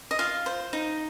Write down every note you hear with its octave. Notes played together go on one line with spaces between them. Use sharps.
D#5
F4 F5
C5
D#4